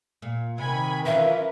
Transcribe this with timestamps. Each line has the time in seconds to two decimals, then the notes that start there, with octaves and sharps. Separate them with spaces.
0.22 A#2
0.58 C3 D#3 G#5 B5
1.06 E3 F#3 C#4 F4 A#4 B4 E5